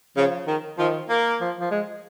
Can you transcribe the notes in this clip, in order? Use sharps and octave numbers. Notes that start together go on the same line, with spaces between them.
C#3 F3
D#3
D#3 F3
A#3
F3
F3
G#3